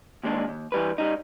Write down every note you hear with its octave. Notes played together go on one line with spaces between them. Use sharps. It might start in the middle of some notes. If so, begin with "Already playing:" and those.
D#2 A#2 G#3 D4
D#2
E3 G3 B4
G3 D#4